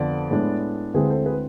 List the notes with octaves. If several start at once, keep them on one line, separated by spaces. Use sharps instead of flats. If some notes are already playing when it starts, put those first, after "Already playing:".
Already playing: F2 D3 F3 B3 D5
A2 G#3 B3 D4
D2 D3 G#3 C4 E4 G#4 B4
A4 C5
G#4 B4